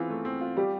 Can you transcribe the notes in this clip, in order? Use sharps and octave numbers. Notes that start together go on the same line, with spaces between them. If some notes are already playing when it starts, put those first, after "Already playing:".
Already playing: E3 B3 C4 F4 G#4
A3
C4
F4
G3 G4